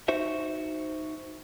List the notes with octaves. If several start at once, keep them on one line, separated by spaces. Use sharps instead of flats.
D#4 F#4 C5 E5